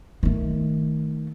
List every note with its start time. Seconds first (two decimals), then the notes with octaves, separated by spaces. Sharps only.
0.23 D#3 A3